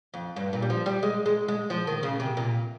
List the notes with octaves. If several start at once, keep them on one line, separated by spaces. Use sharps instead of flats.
F2
G2
A#2
G3
F3
G3
G#3
G#3
G#3
F3
D#3
C#3
C3
A#2